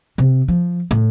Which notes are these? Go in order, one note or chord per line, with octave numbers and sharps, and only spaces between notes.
C3
F3
A2